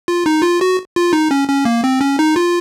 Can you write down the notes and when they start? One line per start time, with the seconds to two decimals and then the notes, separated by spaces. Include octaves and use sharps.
0.08 F4
0.26 D#4
0.43 F4
0.61 F#4
0.96 F4
1.13 D#4
1.31 C#4
1.48 C#4
1.65 A#3
1.84 C4
2.01 C#4
2.19 D#4
2.36 F4